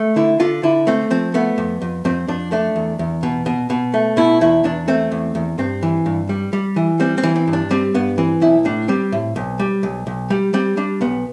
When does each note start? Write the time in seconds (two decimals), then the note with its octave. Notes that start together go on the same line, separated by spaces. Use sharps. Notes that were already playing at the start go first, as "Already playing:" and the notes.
Already playing: A3
0.16 D3 E4
0.40 D3 F4
0.63 D3 E4
0.87 A3 C4
1.11 F3 C4
1.34 A3 B3
1.58 F2
1.82 F2
2.05 F2 C4
2.28 F2 D4
2.52 A3 D4
2.76 E2
2.99 E2
3.23 B2
3.46 B2
3.70 B2
3.94 A3
4.17 B2 E4
4.41 E2 E4
4.64 E2 D4
4.88 A3 C4
5.11 E2
5.35 E2
5.58 G2 C4
5.83 E3
6.06 G2
6.29 G3
6.53 G3
6.76 E3
7.00 G3 C4
7.18 C4
7.23 E3
7.36 C4
7.47 G2
7.53 D4
7.71 G3 C4
7.94 G2 B3
8.18 E3 C4
8.41 B1 E4
8.65 A2 D4
8.88 G3 C4
9.12 A2
9.36 B1
9.59 G3
9.83 B1
10.07 B1
10.30 G3
10.54 G3 C4
10.77 G3 D4
11.01 B1 B3